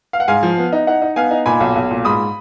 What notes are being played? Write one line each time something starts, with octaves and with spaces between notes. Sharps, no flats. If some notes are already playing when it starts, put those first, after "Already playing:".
F5
F#5
G#2 F5 G#5
F3
B3
D#4
D#4 F#5
D#4
B3 F5 G#5
D#4
A#2 G#5 B5
B1
B1
A#2
G#2 B5 D#6